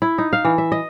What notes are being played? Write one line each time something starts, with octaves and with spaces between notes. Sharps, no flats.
E4
D#4
F5
E3
E5
D#5